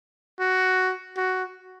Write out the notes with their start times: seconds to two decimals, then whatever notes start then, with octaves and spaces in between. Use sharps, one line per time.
0.39 F#4
1.17 F#4